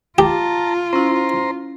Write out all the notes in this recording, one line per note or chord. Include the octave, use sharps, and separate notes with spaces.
F4 G4 A5 A#5
C#4 E4 C5 A#5 C6